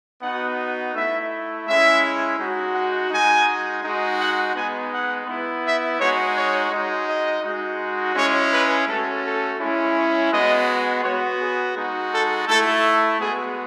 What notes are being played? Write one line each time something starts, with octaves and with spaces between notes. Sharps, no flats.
B3 D#4 F#4 F#5
A3 E4 E5
G#3 C#4 E4 E5
G#3 D#4 F#4
F#5
G#3 D#4 F#4 G#5
G#3 D#4 F#4
F#5
G#3 B3 D#4 G#5
F#5
B3 E4
E5
G#3 D#4 F#4 C#5
C#5
G#3 D#4 F#4
D#5
G#3 D#4 F#4
G#3 C#4 E4 C#5
B4
A3 C#4 F#4 A4
A4
G#3 C#4 E4
C#5
G#3 B3 F#4 D#5
B3 F#4 C#5
G#4
G#3 D#4 F#4
A4
A3 E4 A4
G#3 B3 F#4 G#4